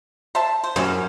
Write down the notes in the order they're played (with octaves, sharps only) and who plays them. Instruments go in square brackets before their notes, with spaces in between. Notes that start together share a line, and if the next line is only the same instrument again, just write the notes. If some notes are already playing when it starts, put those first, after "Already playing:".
[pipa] C5 E5 A5
C5
[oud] F#2 [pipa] C3 E3 C#4